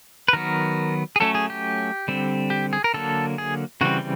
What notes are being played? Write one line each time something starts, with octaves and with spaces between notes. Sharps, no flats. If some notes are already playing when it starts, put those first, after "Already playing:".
B4
D#3 F#3 B3 A#4
G#4
F#3 A3 C#4 A4
G#4
G4
D3 G3 C4
G4
G#4
A#4
D3 F#3 A#3 A4
G#4
C#3 E3 G3 C4 F#4